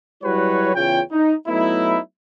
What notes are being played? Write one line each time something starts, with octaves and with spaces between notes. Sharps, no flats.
F#3 G3 E4 F#4 B4 C#5
E2 C#3 F4 C#5 G5
D#4
F#3 A3 B3 D#4 E4